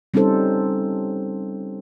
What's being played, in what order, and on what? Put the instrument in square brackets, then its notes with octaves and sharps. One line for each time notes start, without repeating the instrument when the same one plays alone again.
[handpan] G3 C4 C#4 D#4 A4 C5